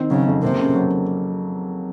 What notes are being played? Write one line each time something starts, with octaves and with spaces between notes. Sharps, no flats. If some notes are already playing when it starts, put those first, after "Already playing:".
Already playing: D#3 C4
C#3 F#3
F2
C3 A#3
C#3
F#3